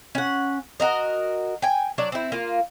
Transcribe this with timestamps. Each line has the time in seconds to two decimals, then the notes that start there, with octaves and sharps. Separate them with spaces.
0.15 C#4 F#5
0.80 F#4 A#4 D#5
1.62 G5 G#5
1.98 F#3 D4 D5
2.12 C4 E4
2.32 A#3 F4